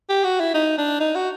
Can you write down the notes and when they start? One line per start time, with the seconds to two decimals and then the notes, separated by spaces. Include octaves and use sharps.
0.09 G4
0.24 F#4
0.40 E4
0.54 D#4
0.78 D4
1.00 D#4
1.15 F#4